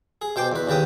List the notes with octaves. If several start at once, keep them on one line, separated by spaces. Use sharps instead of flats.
G#4
B2 C5 G5 D6
E2 B4
D#2 C#3 B4 G5 D#6